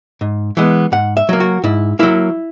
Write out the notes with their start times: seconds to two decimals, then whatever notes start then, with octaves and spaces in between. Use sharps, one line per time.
0.21 G#2
0.57 E3 G#3 B3
0.92 G#2 F#5
1.17 E5
1.29 F#3 A#3
1.40 F#4
1.64 G#2 E4
1.99 F#3 A#3 E4